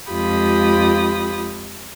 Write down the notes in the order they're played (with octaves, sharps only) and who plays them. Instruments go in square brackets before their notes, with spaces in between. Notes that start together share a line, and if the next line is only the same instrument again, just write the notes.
[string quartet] F2 G#3 F4 G4 B5 D#6